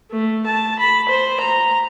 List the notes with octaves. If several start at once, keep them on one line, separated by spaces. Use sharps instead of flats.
A3
A5
B5
C5
A#5